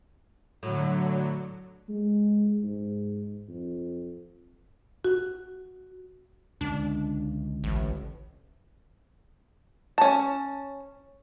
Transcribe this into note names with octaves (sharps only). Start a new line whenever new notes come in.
A2 D3 F#3
G#3
G#2
F2
F#4
C#2 D3 D4
A1
C#4 A5